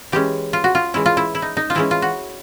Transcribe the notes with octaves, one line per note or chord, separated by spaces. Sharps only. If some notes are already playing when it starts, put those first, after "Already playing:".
E3 G#3 C#4 G4
F4
F#4
F4
E3 G#3 C#4 E4
F4
E4
E4
D#4
D#4
F4
E3 G#3 C#4 E4
F4
F#4